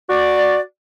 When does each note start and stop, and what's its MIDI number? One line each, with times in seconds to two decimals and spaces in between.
0.09 0.60 66
0.09 0.60 74